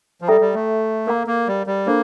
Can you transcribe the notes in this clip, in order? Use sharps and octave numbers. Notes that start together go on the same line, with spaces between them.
F3
G3 A4 E5 G5 A#5
G3
A3
A#3 A#4 F5 A#5
A#3
G3
G3
A#3 D4 F4 A4 C5